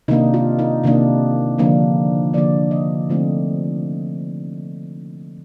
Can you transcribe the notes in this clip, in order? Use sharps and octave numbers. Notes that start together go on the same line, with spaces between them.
C3 D#3 A#3 D4 D#4
F4
D#4
C3 D#3 A#3 D4
D3 F3 A#3 D4
D3 F3 A#3 D4 D5
D#5
D3 F3 A3 C4 D#4